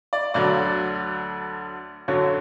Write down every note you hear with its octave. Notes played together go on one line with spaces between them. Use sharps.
D5
D2 D3 F#3 D5
F#2 D3 F#3 C#5